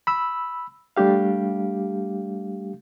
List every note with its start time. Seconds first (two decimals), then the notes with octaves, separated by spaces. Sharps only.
0.07 B5 E6
0.97 G3 A3 D4 G4 F5